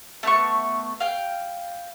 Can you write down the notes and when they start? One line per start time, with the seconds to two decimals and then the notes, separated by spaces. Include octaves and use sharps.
0.23 A3 B3 C#6
1.00 F5 G5